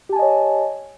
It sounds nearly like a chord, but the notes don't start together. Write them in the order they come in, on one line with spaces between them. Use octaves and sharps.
G4 A5 G#5 D#5 C#5